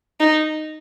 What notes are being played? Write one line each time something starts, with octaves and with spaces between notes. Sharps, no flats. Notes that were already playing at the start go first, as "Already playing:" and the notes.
D#4